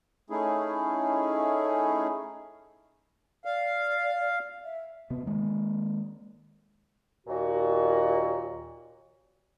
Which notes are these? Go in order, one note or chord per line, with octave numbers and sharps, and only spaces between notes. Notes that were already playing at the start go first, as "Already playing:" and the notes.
A3 C#4 D#4 E4 G#4
D5 F5
E5
C3 B3
D#3 G#3 A#3
D#2 A#2 F#4